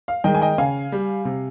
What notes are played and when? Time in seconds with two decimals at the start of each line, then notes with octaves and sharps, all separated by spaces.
0.08 F5
0.24 D#3 G#3 D#5 G5
0.34 G#5
0.41 D#5 G5
0.58 C#3 F5 G#5
0.92 G3
1.25 C3